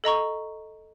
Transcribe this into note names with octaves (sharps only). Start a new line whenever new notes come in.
A4 D#5 A#5 C#6